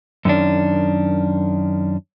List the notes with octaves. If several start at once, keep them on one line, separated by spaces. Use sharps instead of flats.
F#2 D#3 C#4 D4